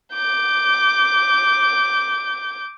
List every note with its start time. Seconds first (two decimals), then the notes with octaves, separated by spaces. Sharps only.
0.13 D6 G6